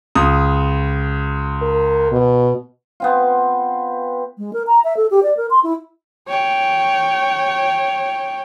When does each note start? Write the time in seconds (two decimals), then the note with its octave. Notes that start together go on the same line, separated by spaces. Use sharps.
0.15 C#2 D#6
1.62 A#4
2.12 B2
3.00 B3 C4 F4
4.38 G#3
4.53 A#4
4.67 A#5
4.84 E5
4.97 A4
5.11 G4
5.23 D5
5.37 A#4
5.51 C6
5.64 E4
6.28 C#5 G5